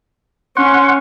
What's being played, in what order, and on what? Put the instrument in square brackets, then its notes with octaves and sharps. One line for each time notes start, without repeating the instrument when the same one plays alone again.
[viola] C#4 [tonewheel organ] F#5 C#6 [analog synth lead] C6